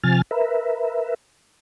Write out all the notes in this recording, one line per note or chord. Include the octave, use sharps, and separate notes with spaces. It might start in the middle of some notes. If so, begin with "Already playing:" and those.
C3 F3 G#5 F6 A6
A#4 B4 E5